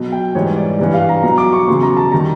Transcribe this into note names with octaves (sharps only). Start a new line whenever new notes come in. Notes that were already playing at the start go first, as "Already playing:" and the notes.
Already playing: B2 F#3
G5
G#2 E3 G3 C#5
D5
G2 E3 G3
F5
A#5
B2 F#3 A#5
D6
C#6
E2 C#3 F#3 C6
A#5
A5
D#3 G3 A#5